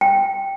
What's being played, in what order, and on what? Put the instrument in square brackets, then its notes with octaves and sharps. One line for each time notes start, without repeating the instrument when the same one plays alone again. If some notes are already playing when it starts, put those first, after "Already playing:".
[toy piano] G5